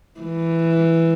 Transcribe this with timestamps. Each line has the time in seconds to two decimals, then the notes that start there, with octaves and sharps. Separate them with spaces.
0.20 E3